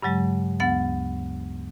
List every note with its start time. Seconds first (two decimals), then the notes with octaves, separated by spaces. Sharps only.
0.03 G2 C#3 F#3 G#3
0.60 D2 B3 F#5 A6